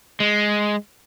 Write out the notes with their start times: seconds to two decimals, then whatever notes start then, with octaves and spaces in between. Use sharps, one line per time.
0.20 G#3